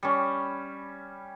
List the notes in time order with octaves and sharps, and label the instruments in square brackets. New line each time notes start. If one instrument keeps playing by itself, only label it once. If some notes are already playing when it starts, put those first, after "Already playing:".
[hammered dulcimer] G3 C#4